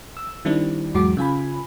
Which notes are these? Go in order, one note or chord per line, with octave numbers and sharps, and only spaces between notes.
E6
D#3 G3 C4 D4 E4
E2 G#2 F#3 G#3 F#4 D6
C#3 F4 G#5 B5